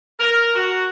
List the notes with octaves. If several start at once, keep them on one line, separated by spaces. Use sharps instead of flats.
A#4
F#4